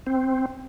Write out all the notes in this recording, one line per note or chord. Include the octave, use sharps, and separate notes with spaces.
C4